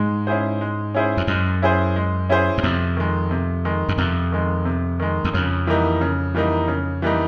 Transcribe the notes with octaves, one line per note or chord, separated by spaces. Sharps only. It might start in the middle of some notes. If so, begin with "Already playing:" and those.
Already playing: G#2 G#3
C#4 E4 G#4 C5
G#3
C#4 E4 G#4 C5
F2
F#2 G#3
C#4 E4 G#4 C5
G#3
C#4 E4 G#4 C5
F#2
F2 C3
D#3 G#3
C3
D#3 G#3
F#2
F2 C3
D#3 G#3
C3
D#3 G#3
E2
F2 C#3
E3 G3 A#3 D#4
C#3
E3 G3 A#3 D#4
C#3
E3 G3 A#3 D#4